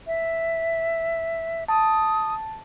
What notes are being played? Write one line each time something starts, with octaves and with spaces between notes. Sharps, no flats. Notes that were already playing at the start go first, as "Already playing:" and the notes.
E5
A5 D#6